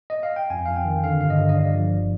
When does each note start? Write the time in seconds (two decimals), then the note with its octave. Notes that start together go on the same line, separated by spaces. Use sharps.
0.10 D#5
0.23 F5
0.36 G5
0.50 F2 G#5
0.66 F2 F5
0.76 G5
0.85 D#3
1.04 D3 F5
1.21 G2 F5
1.30 D#5
1.39 D3
1.49 D#5
1.57 G2 D5
1.74 F3
1.92 G1